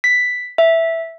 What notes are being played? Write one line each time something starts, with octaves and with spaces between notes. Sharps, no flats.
B6
E5